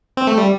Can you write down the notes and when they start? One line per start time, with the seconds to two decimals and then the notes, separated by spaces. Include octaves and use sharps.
0.17 C4
0.27 A3
0.38 G3